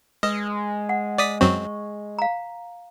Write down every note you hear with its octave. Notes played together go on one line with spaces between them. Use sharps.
G#3 B4 D#5
F#5
D5 D#6 B6
F#2 F#3 C4 C#6
F5 A#5